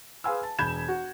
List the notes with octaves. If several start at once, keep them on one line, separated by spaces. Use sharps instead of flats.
G#4 B4 F5 G#5 C6 E6
A5
E1 B5 G6 G#6 E7
F#4